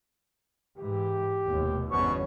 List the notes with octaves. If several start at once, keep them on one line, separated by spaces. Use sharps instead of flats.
G#2 E3 G4
F1 D#2 B2
G1 E2 G#2 B2 C#4 C#6